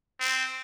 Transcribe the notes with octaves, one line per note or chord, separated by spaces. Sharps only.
C4